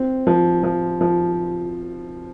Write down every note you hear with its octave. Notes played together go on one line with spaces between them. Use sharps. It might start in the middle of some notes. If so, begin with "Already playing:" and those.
Already playing: C4
F3
F3
F3